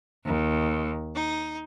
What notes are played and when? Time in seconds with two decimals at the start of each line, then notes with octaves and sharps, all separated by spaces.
0.25 D#2
1.16 D#4